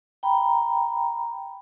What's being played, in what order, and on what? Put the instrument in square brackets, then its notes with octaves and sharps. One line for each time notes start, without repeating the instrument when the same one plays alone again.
[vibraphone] G5 A#5 B5